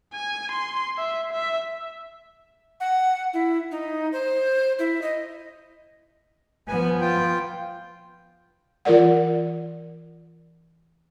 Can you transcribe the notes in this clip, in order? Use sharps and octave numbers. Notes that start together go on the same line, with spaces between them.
G#5
C6
E5
E5
F#5
E4
D#4
C5
E4
D#5
F3 B3 G#5
F4 G5
E3 F4 A#4 D5 F#5